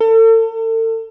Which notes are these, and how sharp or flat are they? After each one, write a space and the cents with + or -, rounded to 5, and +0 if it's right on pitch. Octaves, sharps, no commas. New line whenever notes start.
A4 +40